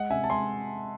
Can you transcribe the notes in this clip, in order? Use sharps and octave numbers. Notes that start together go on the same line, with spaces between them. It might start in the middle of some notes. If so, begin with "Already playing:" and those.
Already playing: G#3 D#5 F#5
C3 E5 G#5
A5
G#3 G#5 C6